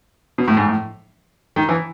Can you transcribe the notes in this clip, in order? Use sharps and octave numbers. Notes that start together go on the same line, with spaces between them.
B2
A2
G#2
A2
D#3
E3